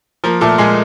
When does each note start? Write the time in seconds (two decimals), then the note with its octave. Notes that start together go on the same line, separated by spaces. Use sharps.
0.24 F3 A#3 A#4
0.41 A#2 A3 A4
0.58 A#2 G#3 G#4